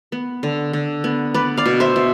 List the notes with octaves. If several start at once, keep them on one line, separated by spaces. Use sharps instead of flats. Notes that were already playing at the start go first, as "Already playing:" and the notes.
B3
D3
D3
B3
B3 B4 D5
D5 F5
B2
C5 E5
B2